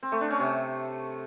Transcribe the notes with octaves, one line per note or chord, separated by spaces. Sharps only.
C4
A3
D4
C#4
C3